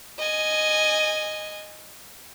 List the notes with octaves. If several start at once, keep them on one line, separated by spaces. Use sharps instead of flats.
D#5 G#5